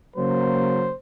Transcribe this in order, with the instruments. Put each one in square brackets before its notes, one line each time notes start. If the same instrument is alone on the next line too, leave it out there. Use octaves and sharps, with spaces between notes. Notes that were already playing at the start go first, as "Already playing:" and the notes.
[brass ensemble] C#3 F#3 A#3 C5